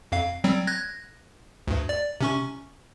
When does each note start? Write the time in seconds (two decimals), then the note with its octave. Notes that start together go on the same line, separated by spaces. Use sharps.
0.12 F2 F5
0.44 F#3 G3 C4
0.67 F#6 G#6 A#6
1.68 D2 G2
1.89 D5
2.21 C3 C#4 C#6